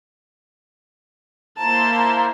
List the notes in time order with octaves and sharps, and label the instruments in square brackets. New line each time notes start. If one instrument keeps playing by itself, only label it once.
[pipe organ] A#3 E4 C5 [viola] A5 [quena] A#5